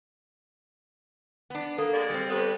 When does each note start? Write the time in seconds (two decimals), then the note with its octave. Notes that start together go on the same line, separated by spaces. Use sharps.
1.50 B3 D4
1.78 A#3 A4
1.93 G#3 D5
2.10 G3 C4
2.29 G2 D3 B3 G4 A4 C5